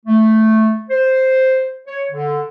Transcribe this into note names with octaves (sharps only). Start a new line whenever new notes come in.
A3
C5
C#5
D3